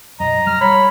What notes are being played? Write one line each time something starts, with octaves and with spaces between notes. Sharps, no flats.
B1 F#2 D#5 A#5
G3 F6
C#5 B5